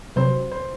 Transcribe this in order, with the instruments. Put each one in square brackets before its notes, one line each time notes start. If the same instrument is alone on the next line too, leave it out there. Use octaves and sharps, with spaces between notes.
[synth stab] C3 F#3 C4 [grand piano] C5
[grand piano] C5